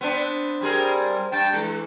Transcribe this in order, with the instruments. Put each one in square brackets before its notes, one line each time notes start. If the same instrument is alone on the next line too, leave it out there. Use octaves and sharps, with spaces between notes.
[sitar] B3 C4 D4
[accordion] G3 [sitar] C4 G#4 A#4
[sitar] G2 [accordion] G5 A5
[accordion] E3 [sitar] G#3